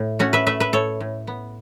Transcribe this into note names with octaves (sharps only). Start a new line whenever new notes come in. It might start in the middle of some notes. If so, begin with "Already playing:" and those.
Already playing: A2
A3 C#4 F#4
B4 E5
A3 B4 E5
B4 E5
A2 A4 C#5
A2
B3